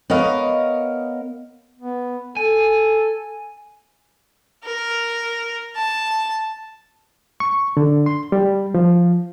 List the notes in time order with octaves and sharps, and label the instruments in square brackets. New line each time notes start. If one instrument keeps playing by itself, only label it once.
[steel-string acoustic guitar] B3 A#4 C#5 D#5 F5
[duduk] B3
[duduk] A4 [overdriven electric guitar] G#5
[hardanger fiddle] A#4
A5
[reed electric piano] C#6
D3
C6
G3
F3